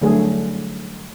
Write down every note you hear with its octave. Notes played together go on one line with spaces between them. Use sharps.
D3 F#3 G3 A3 G#4